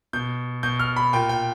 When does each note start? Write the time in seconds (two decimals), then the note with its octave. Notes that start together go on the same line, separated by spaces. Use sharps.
0.13 B2 G6
0.63 B2 G6
0.80 F6
0.96 B5
1.13 A#2 G5
1.29 G5